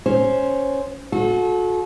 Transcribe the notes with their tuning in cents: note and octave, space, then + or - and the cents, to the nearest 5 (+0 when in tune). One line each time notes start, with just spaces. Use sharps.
C#4 +0 C5 +0
F#4 -35 A4 -35